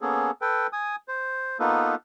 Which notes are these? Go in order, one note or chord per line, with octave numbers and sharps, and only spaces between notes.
A#3 B3 C#4 G#4 A4
A4 B4 G5
G#5 D#6
C5
A#3 B3 D#4 F4 A4 B4